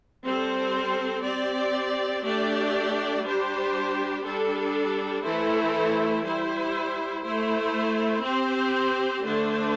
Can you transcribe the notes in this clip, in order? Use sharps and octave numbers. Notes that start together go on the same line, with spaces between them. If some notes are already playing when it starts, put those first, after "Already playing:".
G3 C4 A4 C5
C4 G4 D5
A3 D4 G4 D5
G3 D4 G4 C5
G3 D4 A4
E3 A3 E4 A4 C5
G3 E4 C5
A3 E4 C5
C4 G4 C5
D3 A3 D4 C5